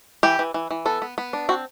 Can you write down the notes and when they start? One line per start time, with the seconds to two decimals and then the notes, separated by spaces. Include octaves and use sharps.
0.23 E3 G4
0.39 E3
0.54 E3
0.71 E3
0.86 B3 A4
1.02 B3
1.18 B3
1.33 D4
1.49 C4 F#4